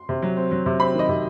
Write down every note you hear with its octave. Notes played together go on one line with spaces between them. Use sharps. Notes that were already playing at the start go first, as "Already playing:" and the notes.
Already playing: C6
C3
F#3
C4
F#3
C3
C4 B5
D#3 D#5
C3